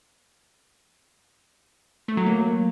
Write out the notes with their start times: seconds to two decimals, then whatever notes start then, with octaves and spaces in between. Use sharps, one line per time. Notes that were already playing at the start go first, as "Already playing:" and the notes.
2.08 A3
2.17 F#3
2.26 A#3